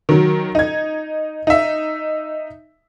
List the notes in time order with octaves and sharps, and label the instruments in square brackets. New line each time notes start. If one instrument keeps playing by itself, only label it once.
[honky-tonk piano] D#3 F#3
D#4 G#6
D#4 E5